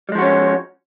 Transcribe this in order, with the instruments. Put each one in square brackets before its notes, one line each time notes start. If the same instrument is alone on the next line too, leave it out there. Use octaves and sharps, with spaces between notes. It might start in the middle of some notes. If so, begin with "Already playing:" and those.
[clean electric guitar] G3
G#3
F3
F#4
C#4